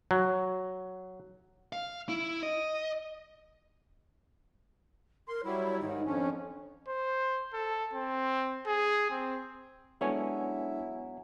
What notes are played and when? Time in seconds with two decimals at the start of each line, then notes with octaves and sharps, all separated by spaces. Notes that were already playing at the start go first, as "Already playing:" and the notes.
0.11 F#3
1.73 F5
2.09 E4
2.43 D#5
5.28 A#4 C6
5.45 F#3 G3 E4 C#5
5.80 G#2 D#3 D#4
6.05 F2 F3 C#4 D4
6.88 C5
7.53 A4
7.93 C4
8.66 G#4
9.10 C4
10.01 F#3 G#3 B3 D4 E4 A4 C#5 G#5